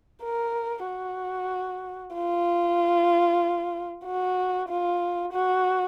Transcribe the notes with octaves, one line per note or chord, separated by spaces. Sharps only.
A#4
F#4
F4
F#4
F4
F#4